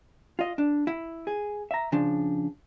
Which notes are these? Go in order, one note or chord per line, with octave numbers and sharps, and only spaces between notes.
F4 D#5
D4
E4
G#4
E5 A#5
C#3 F3 D4